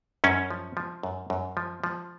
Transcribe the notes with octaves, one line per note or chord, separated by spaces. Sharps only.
F#2 C#4
F3
F3
F#2
F#2
F3
F3